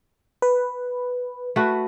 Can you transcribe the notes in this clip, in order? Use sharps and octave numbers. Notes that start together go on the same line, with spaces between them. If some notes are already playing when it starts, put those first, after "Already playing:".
B4
A3 F#4 B4